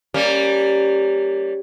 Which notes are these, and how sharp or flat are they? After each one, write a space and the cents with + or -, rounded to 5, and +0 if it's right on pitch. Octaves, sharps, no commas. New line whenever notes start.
G3 +0 A#3 -20 C#4 +0